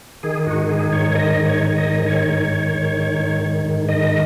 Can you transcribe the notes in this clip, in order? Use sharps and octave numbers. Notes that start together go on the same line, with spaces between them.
D#3 G#4
G#2 F#4
D#3 G#4
G#2 C#5
C#5
D#3 D#5
G#2
C#5
D#3
D#5
G#2
D#3 C#5
G#2
D#3
G#2
D#3
G#2
D#3
G#2
D#3 D#5